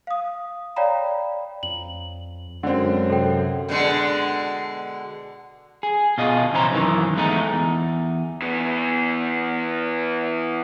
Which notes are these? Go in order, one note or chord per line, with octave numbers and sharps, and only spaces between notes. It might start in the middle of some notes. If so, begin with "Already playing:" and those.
F5 D#6
C#5 D5 F5 G5 A#5 B5
F2 F#7
F#2 D3 G#3 C4
C3 A4 G5
B2 D3 G#3
G#4
B2 F4 D#5
C3 E3 C#4 E4 C5 A#5
F#2 D#3 E3
E2 G#3 A3 D#4
E2
E3 B3